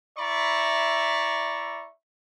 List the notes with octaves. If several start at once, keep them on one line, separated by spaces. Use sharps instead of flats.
E4 D5 E5 A#5 B5 C#6